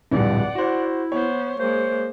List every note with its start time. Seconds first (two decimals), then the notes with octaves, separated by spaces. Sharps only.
0.11 D1 A#1 G2 D5 F#5
0.55 E4 F#4 C5
1.12 B3 C5 C#5
1.60 G#3 A#3 C5